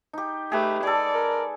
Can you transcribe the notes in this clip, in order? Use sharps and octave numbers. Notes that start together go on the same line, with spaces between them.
D#4 G4
A3 G4 G#4 B4
G#4 A4 D5
A#4